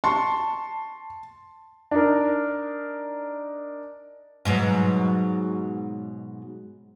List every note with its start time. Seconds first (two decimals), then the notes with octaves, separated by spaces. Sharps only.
0.04 A5 C6 C#6
1.91 D4 D#4 A#4
4.45 G#2 B2 F#3